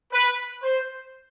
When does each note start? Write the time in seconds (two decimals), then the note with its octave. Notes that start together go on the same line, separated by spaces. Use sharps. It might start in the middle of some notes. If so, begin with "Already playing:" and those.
0.11 B4
0.62 C5